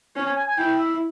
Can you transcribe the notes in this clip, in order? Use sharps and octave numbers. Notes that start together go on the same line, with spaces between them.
C#4 C#5
G#5
G#5
G#5
E4 G5
E5